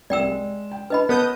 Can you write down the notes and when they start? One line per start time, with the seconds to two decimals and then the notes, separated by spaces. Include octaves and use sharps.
0.10 C2 D5 G5 E6 E7
0.28 G#3
0.71 G5
0.90 C#4 D4 B4 D#5 B5
1.09 B3 A#4 C#5 A5 D#6 G6